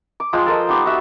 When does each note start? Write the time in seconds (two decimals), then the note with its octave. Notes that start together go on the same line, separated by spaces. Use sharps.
0.20 D6
0.33 F3 G#3 G5 C6
0.46 A4 A#4 C5 D#5
0.69 B3 D#4 G4 C6
0.86 F#4 E5